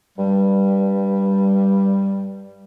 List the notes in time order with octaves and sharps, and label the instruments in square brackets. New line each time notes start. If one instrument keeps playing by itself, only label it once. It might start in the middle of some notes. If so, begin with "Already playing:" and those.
[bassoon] G2 [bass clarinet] G3